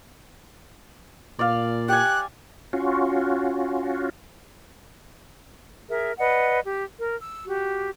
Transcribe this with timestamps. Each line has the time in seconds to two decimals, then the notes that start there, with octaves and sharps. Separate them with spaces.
1.39 A#2 D5 F5
1.88 G4 G#5 F#6
2.73 C#4 F4 F#4
5.89 G#4 A#4 E5
6.18 B4 D5 D#5 F#5
6.63 G4
7.00 A#4
7.21 E6
7.46 F#4 G4